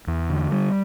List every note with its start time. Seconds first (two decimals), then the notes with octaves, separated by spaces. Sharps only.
0.07 E2
0.30 D3
0.52 G3